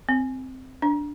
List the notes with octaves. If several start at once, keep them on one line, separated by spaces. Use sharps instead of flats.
C4
D4